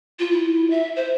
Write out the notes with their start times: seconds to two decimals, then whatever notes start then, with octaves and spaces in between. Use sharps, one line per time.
0.19 F4
0.33 E4
0.70 E5
0.96 C5